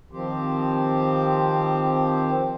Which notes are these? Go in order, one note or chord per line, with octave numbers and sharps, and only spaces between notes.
D#3 F3 C4 G4 C5